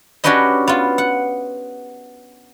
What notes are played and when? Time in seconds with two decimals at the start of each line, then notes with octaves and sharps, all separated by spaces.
0.24 C#4 D4 F#4 G4 B4 D#5
0.68 B3 F4
0.98 F#5